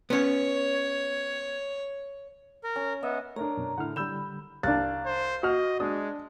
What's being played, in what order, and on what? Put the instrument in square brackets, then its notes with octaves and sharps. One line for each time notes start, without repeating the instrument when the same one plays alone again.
[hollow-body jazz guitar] B3 C#4 [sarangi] C#5
[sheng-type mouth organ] A#4
[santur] C#4
[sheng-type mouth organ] B3 [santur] D#5 E5
[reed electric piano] A3 [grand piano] D4 A#4 C#5 [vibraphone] A#5
[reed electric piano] F#2 B2
[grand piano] A2 D3 [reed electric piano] F#5 F6
[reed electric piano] D3 G3 [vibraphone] B5 [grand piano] E6 G6 E7
[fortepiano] C2 D4 [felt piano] F5 A6 [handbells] F#6
[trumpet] C5
[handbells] F#4 [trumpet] D#5 [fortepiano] F#5 F6
[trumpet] G#3 [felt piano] D4 [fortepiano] D#6